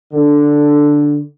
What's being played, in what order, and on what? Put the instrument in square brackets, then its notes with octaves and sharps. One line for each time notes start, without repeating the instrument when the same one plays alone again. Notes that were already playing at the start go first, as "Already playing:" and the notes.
[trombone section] D3